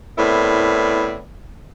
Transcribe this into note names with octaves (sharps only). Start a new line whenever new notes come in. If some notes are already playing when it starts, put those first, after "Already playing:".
A2 B3 C4 E4 A#4 D5